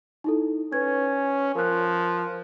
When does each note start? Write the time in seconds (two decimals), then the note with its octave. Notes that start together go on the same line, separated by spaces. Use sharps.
0.24 D#4 E4 A4
0.73 C#4 B4 G#6
1.55 F3 A#4 F#6